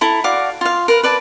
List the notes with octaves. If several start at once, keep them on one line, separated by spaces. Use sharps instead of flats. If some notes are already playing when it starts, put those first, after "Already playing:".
E4 A4 A#5
F#4 D5 F5 D6
F4 F5
A#4 B4
B4 D5 A5